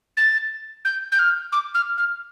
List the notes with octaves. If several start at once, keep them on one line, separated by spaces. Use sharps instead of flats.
A6
G6
G6
F6
D6
F6
F6